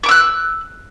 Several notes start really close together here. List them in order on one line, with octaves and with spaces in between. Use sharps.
C#6 D6 E6 F#6